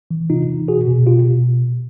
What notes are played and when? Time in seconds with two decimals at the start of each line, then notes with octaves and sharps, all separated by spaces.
0.11 E3
0.30 C3 D#4 F4
0.49 E3
0.68 B2 F#4 G#4
0.87 B2
1.07 B2 F4 G4
1.27 B2